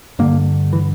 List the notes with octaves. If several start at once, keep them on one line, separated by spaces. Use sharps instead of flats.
G2 D3 A#3
E3